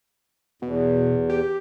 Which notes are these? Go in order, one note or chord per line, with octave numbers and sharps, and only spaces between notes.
E2 B2
G4